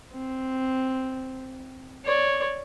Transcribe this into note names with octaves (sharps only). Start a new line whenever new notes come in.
C4
C#5 D5